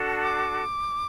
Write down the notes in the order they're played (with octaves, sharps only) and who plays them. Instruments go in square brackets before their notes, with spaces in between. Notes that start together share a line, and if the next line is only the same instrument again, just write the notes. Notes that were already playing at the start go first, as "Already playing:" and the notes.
Already playing: [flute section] D4 F#4 A4
D6